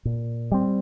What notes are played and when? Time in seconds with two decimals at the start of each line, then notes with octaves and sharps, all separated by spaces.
0.05 A#2
0.52 G3 C4